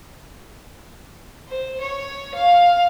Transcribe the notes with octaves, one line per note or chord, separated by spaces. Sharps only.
C5
C#5
F5